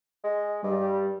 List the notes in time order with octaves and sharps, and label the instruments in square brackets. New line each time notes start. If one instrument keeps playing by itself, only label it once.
[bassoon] G#3
[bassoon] G2 [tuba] G3